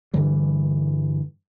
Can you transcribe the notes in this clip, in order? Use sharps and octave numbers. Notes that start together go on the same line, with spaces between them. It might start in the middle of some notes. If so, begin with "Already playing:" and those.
G2 D3 E3 G3